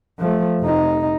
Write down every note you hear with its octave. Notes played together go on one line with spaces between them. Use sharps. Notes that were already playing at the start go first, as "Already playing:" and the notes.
F3 A3
F1 D#4